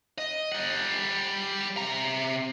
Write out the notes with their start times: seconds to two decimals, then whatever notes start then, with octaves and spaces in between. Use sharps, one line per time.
0.18 D#5
0.52 G3 F#5
1.77 C3 A#5